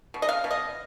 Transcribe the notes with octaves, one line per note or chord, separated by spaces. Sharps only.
B2
D#5
F5
B2
D#5